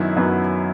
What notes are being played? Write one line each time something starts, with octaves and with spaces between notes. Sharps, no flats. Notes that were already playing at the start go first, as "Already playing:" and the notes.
Already playing: F#2 D#3 F#3 B3 E4
F#2 D#3 F#3 B3